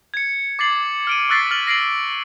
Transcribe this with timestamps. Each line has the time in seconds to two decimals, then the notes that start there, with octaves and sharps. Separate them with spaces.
0.14 G#6 C#7
0.59 D6 A6 C7 F#7
1.07 F6 D7 D#7
1.29 C#6 E6 F#6 A6 B6 C7
1.51 F6 A6 F#7
1.67 A#6 C7 D7 F#7